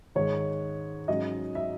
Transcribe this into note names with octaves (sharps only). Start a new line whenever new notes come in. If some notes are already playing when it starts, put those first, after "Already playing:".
G#2 D#3 G#3 C#5
G#2 F#3 C#4 D#5
E5